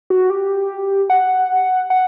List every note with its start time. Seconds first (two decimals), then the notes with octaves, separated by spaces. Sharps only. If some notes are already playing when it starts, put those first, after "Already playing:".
0.10 F#4
0.30 G4
1.10 F#5
1.90 F#5